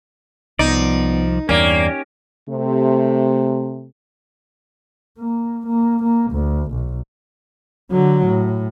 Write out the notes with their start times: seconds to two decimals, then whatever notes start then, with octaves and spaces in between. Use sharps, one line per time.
0.59 C2 F3 B3 D#4 D5
1.49 E2 G2 A#3 C#4 G4 C#5 D5
2.49 C3 A3
5.19 A#3
5.67 A#3
6.03 A#3
6.32 D2
6.71 B1
7.91 D3 F#3
8.26 A2